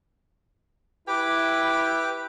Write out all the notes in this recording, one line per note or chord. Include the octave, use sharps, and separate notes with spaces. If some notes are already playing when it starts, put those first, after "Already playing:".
E4 G4 B4 D6